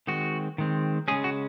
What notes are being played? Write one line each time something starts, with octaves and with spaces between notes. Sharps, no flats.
D#3 G#3 C4 F#4
D#3 G#3 C4
C#3 G#3 C#4 G#4
F#4